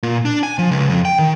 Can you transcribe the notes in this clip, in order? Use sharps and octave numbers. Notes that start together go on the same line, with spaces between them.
A#2
D4
G#5
F3
C#2
F2
G5
D#3